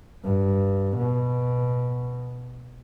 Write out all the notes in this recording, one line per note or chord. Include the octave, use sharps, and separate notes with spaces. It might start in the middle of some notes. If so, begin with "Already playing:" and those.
G2
B2